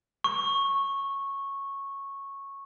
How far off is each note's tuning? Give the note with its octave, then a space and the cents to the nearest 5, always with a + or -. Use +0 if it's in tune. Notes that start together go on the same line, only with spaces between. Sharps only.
C#6 -10